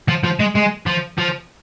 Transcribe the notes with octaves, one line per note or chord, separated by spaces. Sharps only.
F3
F3
G#3
G#3
F3
F3